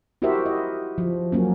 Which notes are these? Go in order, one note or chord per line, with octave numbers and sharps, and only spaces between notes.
E4 F#4 G4 A#4 C5 E5
D#5
F3
F#3 A#3 C#4